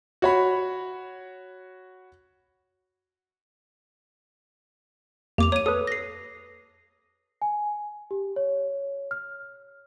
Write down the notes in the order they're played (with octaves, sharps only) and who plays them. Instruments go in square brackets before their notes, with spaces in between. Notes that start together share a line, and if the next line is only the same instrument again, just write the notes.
[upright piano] F#4 C#5 B5
[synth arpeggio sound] F2 A#3 [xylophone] G4 D6 F7
[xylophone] C#5 D#7
[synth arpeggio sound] A4 B4 [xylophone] D#6
[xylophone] A#6 C7
[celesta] G#5
G4
C#5
F6